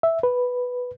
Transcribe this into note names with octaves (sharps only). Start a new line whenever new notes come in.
E5
B4